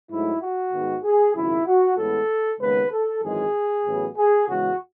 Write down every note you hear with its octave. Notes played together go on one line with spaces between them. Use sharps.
G#2 F#3 A3 E4
F#4
G#2 D#3 G#3 B3
G#4
G#1 F#2 C#3 E4
F#4
A1 A2 G#3 B3 A4
D#2 C#3 G#3 B3 B4
A4
G#1 F#2 E3 G#3 G#4
A1 A2 F#3 B3
G#4
E2 C#3 G#3 F#4